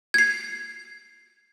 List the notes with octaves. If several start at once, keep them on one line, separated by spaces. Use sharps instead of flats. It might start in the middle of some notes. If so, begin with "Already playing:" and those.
G#6 C7